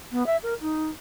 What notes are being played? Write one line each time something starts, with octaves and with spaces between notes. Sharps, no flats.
B3
E5
A#4
D#4